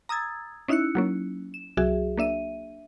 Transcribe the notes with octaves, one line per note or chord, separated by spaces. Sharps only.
A#5 D#6 E6 G#6 A6
C#4 D#4 E4 E6 F#6 C#7
F#3 A#3 C#4
E7
C2 F#3 F#4 G#4 E5
A#3 D4 E5 D#7